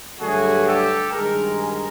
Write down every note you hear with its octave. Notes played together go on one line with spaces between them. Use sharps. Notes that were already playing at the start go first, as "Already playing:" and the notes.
G2 D3 F#3 A3 F#4 G#4
G4 A4
G2 D#3 G#3 G#4 A#4
G#4 A#4